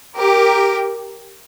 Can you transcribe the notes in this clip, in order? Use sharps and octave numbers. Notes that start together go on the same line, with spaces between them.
G4 A#4